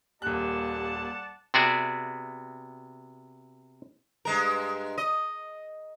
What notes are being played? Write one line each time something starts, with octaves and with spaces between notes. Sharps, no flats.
D#1 A#3 G4 D5 F#5 A5 F#6
C3 B3 F#4 G#4 D5 E5
G2 G#3 A#4
D#5